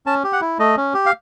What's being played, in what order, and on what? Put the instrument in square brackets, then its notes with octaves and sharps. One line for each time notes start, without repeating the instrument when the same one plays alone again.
[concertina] C#4 A5
G4
F#5
E4
A3 D#5
C#4
G4
F5